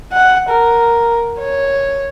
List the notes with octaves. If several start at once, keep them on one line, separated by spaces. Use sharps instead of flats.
F#5
A#4
C#5